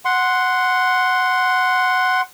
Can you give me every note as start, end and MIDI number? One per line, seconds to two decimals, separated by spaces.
0.05 2.21 78
0.05 2.21 84